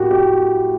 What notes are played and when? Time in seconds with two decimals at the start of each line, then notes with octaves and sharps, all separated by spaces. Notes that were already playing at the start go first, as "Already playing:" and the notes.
Already playing: A2 F#4 G4 A#4
0.11 G4